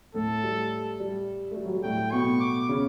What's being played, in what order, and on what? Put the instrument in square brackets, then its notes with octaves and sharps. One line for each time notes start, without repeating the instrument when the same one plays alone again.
[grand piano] A2 A3 [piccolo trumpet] A4
[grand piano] G3
G3
A3
G3
F#3
G3
[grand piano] A2 A3 [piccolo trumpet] G5
[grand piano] B2 B3 [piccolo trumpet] C#6
[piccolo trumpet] D6
[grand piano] C#3 C#4